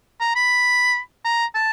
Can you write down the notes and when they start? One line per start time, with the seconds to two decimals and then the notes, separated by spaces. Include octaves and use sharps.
0.21 A#5
0.36 B5
1.25 A#5
1.55 A5